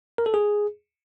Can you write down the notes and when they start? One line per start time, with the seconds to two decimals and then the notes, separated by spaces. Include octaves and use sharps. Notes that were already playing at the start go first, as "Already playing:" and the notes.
0.18 A#4
0.26 A4
0.34 G#4